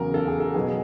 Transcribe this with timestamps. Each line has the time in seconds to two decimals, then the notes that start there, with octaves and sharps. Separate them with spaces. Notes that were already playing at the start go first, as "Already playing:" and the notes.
Already playing: E2 C#3 F#3 A#4
0.14 A4
0.28 G#4
0.40 A4
0.54 B2 F#3 B3 G#4